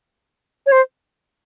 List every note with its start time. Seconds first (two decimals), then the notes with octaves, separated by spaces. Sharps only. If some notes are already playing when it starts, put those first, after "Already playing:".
0.66 C#5
0.72 C5